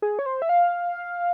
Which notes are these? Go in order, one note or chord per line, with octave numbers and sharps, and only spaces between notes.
G#4
C#5
C5
E5
F5